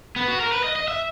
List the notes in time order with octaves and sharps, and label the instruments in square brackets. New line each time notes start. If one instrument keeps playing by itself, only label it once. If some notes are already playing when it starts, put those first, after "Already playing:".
[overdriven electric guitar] B3
F#4
A#4
B4
D#5
D#5
E5